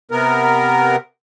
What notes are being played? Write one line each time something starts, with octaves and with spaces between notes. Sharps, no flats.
C3 B3 A#4